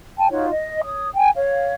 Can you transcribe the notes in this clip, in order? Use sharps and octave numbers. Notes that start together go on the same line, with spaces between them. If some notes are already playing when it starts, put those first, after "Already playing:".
G5 A5
D#4 F4 F#4 C#5
D#5
C#5 D#6
G5 G#5
C#5 F5